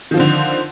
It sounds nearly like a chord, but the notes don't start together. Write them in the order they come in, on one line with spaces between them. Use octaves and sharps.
D#3 F3 C4 D3